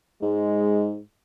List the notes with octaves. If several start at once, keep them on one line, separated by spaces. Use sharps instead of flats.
G#2 G#3